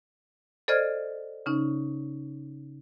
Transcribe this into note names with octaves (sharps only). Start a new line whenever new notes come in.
A4 C5 D5 D#5 F6 G#6
C#3 C#4 D#4